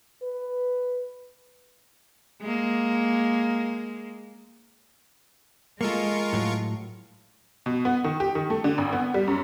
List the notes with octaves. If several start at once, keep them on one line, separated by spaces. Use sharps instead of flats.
B4
G#3 A#3
G#3 A#3 F4 A4 A#4 C#6
A2 F#3
B2
B3
D#3
G4
D#3
A3
D3
G#1
B3
G3
F#2